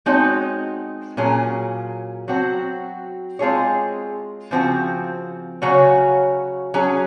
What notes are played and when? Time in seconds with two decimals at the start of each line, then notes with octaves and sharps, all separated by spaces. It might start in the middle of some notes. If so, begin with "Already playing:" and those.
0.06 G#3 C4 D#4 F#4 C#5
1.17 A#2 F#3 C#4 G#4
2.28 F#3 C4 F#4
3.39 G#3 C4 F4 G#4 C#5
4.51 C#3 F3 C4 F#4
5.62 C#3 F#3 C#4 F#4 C#5
6.74 F#3 C#4 G#4